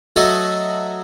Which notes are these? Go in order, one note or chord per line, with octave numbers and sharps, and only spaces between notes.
F#3 A3 F#4 A4 D#5